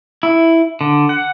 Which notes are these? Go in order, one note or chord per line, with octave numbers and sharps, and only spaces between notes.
E4
D3
F#5